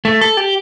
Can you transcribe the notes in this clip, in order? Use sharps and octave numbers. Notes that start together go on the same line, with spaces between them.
A3
A4
G4